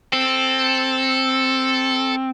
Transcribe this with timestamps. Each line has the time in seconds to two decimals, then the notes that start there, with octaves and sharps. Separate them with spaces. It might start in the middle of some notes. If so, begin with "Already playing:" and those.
0.13 C4 A4